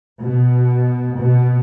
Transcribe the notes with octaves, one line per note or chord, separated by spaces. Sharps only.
B2
B2